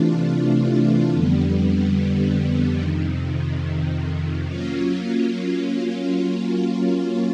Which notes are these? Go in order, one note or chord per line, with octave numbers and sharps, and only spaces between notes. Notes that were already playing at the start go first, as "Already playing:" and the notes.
Already playing: C3 E3 A3 D4 F4
F2 D3 G3 B3
F2 C3 D#3
F#3 A#3 C#4 F4